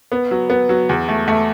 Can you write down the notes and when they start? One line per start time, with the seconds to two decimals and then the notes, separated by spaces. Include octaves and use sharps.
0.12 B3
0.31 F#3
0.50 B3
0.69 F#3
0.89 E2
1.09 A3
1.28 A3